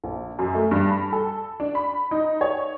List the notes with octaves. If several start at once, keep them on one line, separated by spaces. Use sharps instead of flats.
A#1
F#2
A3
G2
B5
A4
D4
B5
D#4
C#5